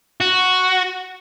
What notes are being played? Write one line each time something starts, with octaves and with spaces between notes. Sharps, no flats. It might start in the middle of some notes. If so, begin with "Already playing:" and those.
F#4